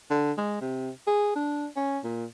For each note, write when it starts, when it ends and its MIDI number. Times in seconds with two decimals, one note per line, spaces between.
0.11 0.32 50
0.38 0.59 56
0.61 0.90 48
1.07 1.35 68
1.36 1.67 62
1.76 1.99 61
2.04 2.25 46